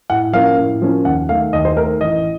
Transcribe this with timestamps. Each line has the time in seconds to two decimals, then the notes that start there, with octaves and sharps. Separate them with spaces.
0.10 A2 F#5
0.33 F3 A#3 C#4 F5
0.58 A2
0.82 F3 A#3 C#4
1.05 D#2 F#5
1.29 D#3 A3 F5
1.53 D#2 D#5
1.65 C5
1.77 D#3 A3 A#4
2.01 A1 D#5